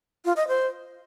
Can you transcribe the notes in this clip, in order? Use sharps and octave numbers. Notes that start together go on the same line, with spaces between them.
F4
D#5
C5